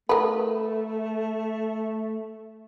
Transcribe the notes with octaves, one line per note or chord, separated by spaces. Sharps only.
A3 A#4 B4